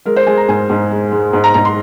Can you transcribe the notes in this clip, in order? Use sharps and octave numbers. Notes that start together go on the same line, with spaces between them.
G#3 A#4
C5
G#3 G#5
A#5
G#2 G#5
G#2
G#3
G#3
G#2
A#5
G#2 A#5
C6